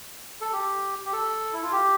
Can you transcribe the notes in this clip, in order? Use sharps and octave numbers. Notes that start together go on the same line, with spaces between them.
A4
G4
G4
A4
E4
F4
G4